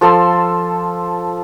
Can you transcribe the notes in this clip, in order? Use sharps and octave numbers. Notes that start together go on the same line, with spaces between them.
F3 A4 C6 E6